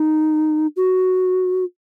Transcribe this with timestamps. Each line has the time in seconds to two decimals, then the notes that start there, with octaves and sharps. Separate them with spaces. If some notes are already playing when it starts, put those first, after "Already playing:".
Already playing: D#4
0.77 F#4